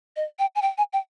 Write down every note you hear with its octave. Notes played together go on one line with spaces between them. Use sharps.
D#5
G5
G#5
G5
G#5
G5